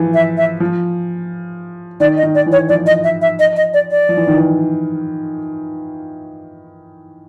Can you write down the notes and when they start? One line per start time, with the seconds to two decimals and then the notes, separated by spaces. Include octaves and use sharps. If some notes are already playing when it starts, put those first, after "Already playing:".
Already playing: E3 F3
0.14 E5
0.37 E5
0.60 F3
2.00 D#3 D5
2.17 D#5
2.23 D#3
2.35 D5
2.46 E3
2.52 C#5
2.69 F3 D5
2.86 D#5
3.04 E5
3.21 E5
3.39 D#5
3.56 D#5
3.74 D5
3.91 D5
4.09 F3
4.17 E3
4.27 D#3
4.37 E3